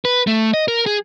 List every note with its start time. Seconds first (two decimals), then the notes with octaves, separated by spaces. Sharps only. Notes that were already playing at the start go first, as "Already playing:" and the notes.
0.05 B4
0.27 A3
0.54 D#5
0.68 A#4
0.86 G#4